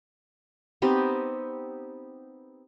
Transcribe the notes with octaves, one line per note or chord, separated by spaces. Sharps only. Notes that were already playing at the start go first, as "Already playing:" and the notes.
B3 C4 D#4 G4